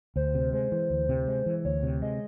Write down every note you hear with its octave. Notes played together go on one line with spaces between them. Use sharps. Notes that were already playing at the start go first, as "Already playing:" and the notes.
D2 C5
C3
G#3 C5
E3
D2
C3
G#3
E3
D2 C#5
C3
G#3 D#5